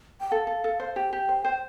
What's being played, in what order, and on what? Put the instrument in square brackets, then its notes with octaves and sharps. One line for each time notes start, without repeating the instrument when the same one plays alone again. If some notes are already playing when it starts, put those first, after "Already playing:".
[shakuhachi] G5
[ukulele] A4 [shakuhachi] F5
[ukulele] A4
A4
C5
[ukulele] G4 [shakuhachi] G5
[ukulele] G4
C5
C5